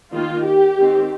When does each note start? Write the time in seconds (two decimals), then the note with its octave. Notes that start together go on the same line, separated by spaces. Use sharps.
0.12 D#3 A#3 F4
0.45 G4
0.78 D#3 C4